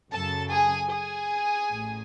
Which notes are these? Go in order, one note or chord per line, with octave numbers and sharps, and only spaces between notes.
F#2 C#3 F#3 A4 A5
G#4 G#5
G#4 G#5
A1 A2